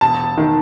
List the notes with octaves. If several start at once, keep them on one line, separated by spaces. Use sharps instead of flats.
E1 A5
D#3